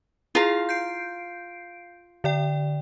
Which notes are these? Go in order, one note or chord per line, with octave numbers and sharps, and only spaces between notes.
E4 F4 G#4 F5 A#5
G6 C7 D7
D3 D5 G5